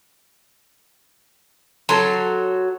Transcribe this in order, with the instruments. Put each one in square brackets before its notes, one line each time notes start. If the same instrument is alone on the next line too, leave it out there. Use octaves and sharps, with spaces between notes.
[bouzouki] F#3 [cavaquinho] A4 C6